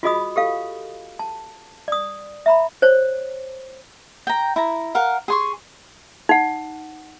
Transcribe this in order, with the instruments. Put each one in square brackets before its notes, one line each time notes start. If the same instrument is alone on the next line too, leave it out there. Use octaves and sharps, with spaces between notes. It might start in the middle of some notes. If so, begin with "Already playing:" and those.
[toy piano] F4 F#4 G#4 D#5 B5 D#6
G4 A4 F5
A5
D5 D#6
E5 A#5 B5
C5 C#5
[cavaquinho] G5 A#5
E4 A#5
A#4 F5 F#5
G#4 C6 C#6
[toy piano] D#4 F#5